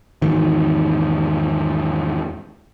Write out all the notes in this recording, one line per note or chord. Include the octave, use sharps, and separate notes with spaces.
E2 G#2 D#3